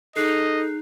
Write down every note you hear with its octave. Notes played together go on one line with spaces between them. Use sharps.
D#4 G#4 A4 D#5 F#6 C7